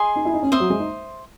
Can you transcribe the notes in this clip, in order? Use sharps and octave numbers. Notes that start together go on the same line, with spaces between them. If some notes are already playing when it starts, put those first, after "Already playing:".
Already playing: G#4 D#5 G#5 C6
D#4
E4
D#4
C#4
C4 C5 E5 C6 D#6
F#3
G#3
D#4